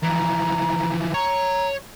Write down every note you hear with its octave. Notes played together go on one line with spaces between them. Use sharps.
E3 F3 A#5
C#5 A#5